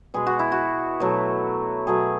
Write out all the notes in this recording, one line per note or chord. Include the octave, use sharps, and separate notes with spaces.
B2 G#3 G#4
F#4
E4
F#4
B2 F#3 A3
B2 F#3 A3 G#4